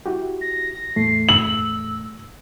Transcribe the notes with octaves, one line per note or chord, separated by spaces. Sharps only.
E4 F#4 G4
A#6
E2 A2 A3 C7
E6 F#7